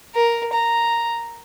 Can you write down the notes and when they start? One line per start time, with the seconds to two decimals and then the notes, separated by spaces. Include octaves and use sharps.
0.15 A#4
0.53 A#5